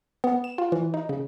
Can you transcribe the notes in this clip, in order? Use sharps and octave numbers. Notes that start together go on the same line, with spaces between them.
B3
E7
F4
E3
D#4
C#3